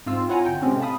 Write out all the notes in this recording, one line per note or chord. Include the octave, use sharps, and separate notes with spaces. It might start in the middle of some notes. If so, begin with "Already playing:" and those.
G#2 C4 F4 F5 E6
E4 F4 C#5 F#5 G#5 A#5
G1 G5 G6
A2 C3 G#3 C4 C#4
F5 A5 B5 D#6